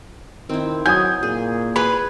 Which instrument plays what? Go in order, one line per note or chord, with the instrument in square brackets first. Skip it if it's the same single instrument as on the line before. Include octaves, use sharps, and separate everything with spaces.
[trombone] D#3 [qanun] C4 E4
[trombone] F#3 [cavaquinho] G#5 [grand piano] D#6 G6
[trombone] A#2 [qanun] G#4
[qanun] G#4 [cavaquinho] B4 B5